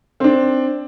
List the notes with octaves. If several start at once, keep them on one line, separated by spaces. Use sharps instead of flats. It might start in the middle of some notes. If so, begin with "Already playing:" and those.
C4 D4